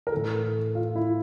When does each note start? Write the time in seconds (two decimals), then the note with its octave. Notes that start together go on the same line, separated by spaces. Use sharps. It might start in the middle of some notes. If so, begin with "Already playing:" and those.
0.07 A#4
0.12 A2 E3 A4
0.75 F4
0.96 E4